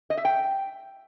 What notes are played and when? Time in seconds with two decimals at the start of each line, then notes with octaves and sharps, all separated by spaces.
0.10 D#5
0.17 E5
0.25 G5